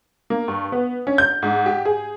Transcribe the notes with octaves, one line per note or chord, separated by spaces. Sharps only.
A#3
G2
B3
C#4
G6
G#2
G4
G#4